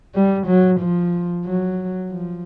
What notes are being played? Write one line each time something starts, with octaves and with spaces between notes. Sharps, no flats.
G3
F#3
F3
F#3
F3